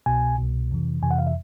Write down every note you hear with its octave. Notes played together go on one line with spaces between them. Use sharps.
C2 B2 G#5
C2 B2
F2 C3 E3
F2 C3 E3 G#5
F#5
F5
E5